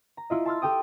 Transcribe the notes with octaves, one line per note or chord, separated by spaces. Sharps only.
A#5
E4 F4 D#5
A5 C6 E6 F6
G4 A4 G5 D#6